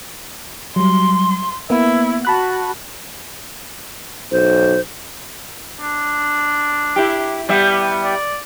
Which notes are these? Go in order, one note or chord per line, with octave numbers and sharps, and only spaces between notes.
F#3 G3 C6
A#3 B3 E4
F#4 A5 B5 F#6
B1 C5
D4
E4 G4
G3 B3 E5
D5